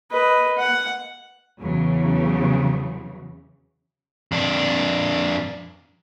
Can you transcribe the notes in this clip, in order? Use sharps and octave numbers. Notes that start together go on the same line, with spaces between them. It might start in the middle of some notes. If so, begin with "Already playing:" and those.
B4 D#5
F#5
E2 C#3 E3 F#3
F2 D4